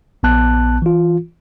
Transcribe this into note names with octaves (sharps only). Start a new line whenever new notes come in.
A#1 B3 A5 F#6
E3 F4